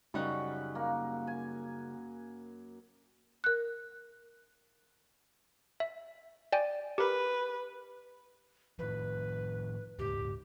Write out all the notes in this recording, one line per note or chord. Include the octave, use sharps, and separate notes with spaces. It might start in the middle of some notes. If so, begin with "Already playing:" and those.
F#2 C#3 G3 D#4 F#5 B5
A#3
G#5
A#4 F#6
E5
D5 G5 G#5
G4 A#4 B4
A2 D#3 F3 B4
D#1 C#2 G#2 G4